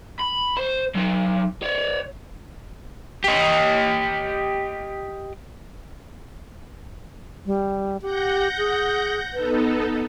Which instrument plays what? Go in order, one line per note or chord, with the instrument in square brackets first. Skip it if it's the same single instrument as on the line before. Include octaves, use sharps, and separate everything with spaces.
[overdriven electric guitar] B5
C5
F#3 D#4
C#5 D5
G4 D#5
[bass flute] G3
[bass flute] G4 [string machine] F#5 G6 A#6
[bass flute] G#4
[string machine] B3 D#4 A4 [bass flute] B4